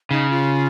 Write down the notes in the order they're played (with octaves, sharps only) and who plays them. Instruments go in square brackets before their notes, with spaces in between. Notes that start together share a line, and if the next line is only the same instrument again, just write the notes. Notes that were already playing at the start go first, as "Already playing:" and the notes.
[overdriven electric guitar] C#3 [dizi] D#4
[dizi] F4